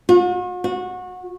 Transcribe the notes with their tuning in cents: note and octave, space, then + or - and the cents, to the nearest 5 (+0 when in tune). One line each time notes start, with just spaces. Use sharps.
F#4 -45
F#4 -25